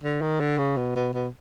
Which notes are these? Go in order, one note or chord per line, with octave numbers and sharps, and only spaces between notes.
D3
D#3
D3
C#3
B2
B2
B2